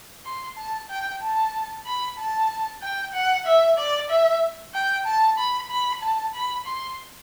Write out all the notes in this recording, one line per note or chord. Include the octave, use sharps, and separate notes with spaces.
C6
A5
G5
A5
B5
A5
G5
F#5
E5
D5
E5
G5
A5
B5
B5
A5
B5
C6